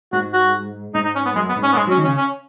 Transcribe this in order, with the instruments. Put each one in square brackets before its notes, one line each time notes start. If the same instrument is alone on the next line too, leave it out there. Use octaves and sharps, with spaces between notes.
[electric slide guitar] G#2 [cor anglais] F#4
[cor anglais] F#4
[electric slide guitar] G#2 [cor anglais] D#4
[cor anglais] D#4
C#4
B3
[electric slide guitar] F#2 [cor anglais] G#3
[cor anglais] B3
[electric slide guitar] G#2
[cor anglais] C#4
B3
[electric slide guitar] G#2 [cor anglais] G#3
[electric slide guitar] F#3 [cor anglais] C#4
[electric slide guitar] D#3
[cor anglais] C#4
[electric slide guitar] C#3
[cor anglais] C#4